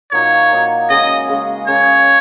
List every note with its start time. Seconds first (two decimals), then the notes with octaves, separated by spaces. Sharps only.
0.12 A#2 F#3 A#3 D#4 C#5
0.50 A#2 F#3 A#3 D#4
0.89 C#3 G#3 C#4 G#4 D#5
1.28 C#3 G#3 C#4 G#4
1.68 C#3 A#3 C#4 C#5